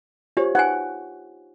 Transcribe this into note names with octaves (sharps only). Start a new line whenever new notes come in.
D4 F4 G4 C5 C#5
D#4 F#5 G#5